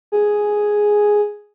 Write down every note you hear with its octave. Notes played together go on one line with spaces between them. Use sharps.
G#4